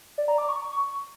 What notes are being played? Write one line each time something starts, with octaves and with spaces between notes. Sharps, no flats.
D5
A#5
D6
C#6